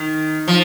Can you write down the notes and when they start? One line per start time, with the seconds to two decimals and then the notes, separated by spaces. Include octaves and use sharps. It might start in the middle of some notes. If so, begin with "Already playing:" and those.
Already playing: D#3
0.48 F3